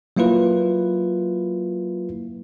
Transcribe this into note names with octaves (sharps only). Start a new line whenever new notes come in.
F#3 A#3 E4 F4 B4